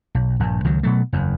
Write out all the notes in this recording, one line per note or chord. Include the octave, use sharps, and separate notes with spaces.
B1
A#1 G2
C#2 D#3 F#3
B2 F#3 A3
F#1 E2